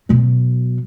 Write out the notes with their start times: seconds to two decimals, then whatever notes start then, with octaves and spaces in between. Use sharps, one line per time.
0.09 B2 F#3